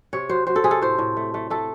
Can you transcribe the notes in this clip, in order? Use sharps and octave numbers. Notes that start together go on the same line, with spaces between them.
C3 C#5
F#3 C5
F#3 C5
A4
C3 G#4
A4
A2 C5
A2
A3
A3
A3 A4